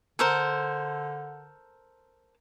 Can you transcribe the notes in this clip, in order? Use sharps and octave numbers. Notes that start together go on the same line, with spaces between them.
D3 A4 A#4 C5